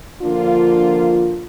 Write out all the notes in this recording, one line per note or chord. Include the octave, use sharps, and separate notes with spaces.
D3 F3 A#3 D4 F4